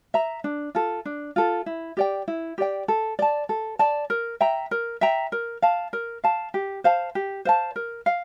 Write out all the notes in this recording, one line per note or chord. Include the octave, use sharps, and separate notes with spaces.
E5 A#5
D4
F4 A4
D4
F4 A4
E4
G4 D5 G5
E4
G4 D5 G5
A4
D5 A5
A4
D5 A5
A#4
E5 G5 A#5
A#4
E5 G5 A#5
A#4
F5 A5
A#4
F5 A5
G4
C5 F5 A5
G4
C5 F5 A5
A#4
F5